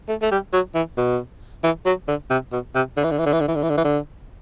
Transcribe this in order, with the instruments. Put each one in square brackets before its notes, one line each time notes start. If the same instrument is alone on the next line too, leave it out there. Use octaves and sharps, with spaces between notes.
[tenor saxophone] A3
A3
G3
F#3
E3
B2
E3
F#3
D3
C3
B2
C3
D3
E3
D3
E3
D3
E3
D3
E3
D3
E3
D3
E3
D3